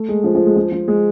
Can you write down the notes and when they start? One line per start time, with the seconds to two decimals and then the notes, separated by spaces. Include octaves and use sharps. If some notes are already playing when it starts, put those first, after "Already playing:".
Already playing: A3
0.09 G#3
0.24 F3
0.35 F3
0.46 G#3
0.56 F3
0.72 F3
0.88 G#3